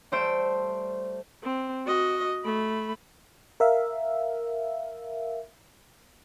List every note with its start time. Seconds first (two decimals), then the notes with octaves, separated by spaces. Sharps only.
0.12 G3 A3 C5 E6 D7
1.43 C4
1.86 F#4 D#5
2.44 A3 B5
3.60 A#4 E5 F5